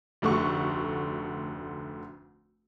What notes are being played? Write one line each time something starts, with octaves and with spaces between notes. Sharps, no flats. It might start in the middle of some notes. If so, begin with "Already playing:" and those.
F1 D2 A3 F#4 C#6